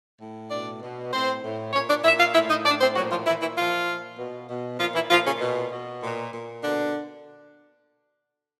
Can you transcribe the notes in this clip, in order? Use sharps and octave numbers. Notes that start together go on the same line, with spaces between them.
A2
B2 D4 D5
B2
A2 C4 C5
A2
A#2 C#4 C#5
D4 D5
A#2 E4 E5
F4 F5
A2 E4 E5
D#4 D#5
A2 D4 D5
C4 C5
A#2 F#3 F#4
F3 F4
A#2 E3 E4
E3 E4
A#2 F3 F4
A#2
B2
B2
A#2 F3 F4
E3 E4
A#2 F3 F4
C#3 C#4
B2
B2
A#2
A#2
B2 D3 D4